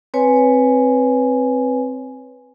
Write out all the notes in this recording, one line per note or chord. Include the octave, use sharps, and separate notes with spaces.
C4 B4 C#5 G#5